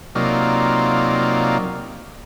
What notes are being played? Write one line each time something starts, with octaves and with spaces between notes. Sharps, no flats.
C3 F#3 A#3 D#4 F4 D5